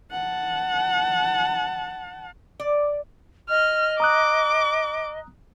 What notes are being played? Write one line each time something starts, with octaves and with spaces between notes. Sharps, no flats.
F#5 A5
D5
D#5 F6
A#5 D6 D#6 F#6